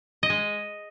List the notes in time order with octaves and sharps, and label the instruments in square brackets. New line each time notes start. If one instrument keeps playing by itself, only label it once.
[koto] D#5
G#3